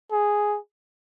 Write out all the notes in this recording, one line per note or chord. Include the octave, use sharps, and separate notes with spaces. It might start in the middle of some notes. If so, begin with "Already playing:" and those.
G#4